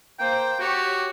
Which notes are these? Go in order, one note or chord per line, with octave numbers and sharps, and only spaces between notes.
A#3 C5 G5
F#4 G4 C#5